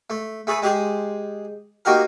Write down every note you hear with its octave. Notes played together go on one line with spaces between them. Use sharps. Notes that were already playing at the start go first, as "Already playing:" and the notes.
A3
A3 G#4 A4 B4
G#3 G4 G#4 C5
A#3 D#4 F#4 G4 A#4